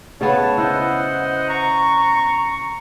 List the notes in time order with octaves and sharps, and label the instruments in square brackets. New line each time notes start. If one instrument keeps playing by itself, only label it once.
[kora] C#3 B3 F#5 [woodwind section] C#5 A5
[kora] E4 [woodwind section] C5 D#5 F#5
[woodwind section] A#5 C#6